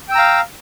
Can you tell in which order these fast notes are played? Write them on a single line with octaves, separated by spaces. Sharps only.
G5 E6 A#5 F5